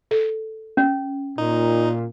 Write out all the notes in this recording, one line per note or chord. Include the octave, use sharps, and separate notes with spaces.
A4
C#4
A#2 D#4